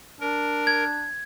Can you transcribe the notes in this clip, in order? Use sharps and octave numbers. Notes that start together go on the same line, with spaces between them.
D4 A#4
G#6